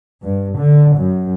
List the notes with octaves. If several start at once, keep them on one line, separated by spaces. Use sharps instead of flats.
G2
D3
F#2